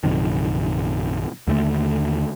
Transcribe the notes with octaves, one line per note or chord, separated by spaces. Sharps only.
A#1 F#2 C3 D#3
D#2 D3 A3